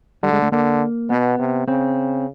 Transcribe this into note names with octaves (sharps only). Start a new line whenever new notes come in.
D3 G3
G#3
A3
D3 A#3
B2 B3
C3
C#3 C4